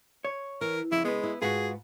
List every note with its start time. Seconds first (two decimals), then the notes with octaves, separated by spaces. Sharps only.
0.25 C#5
0.61 E3 A#4
0.92 F2 C#3 E4
1.05 G#3 B3 B4
1.24 E4
1.42 G#2 F4 F#4 G#4 B4